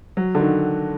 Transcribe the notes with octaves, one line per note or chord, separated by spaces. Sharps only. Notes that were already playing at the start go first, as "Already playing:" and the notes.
F#3
D3
D#3